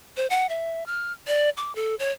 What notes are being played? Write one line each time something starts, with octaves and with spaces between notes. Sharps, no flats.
C5
F#5
E5
F6
D5
D6
A4
C#5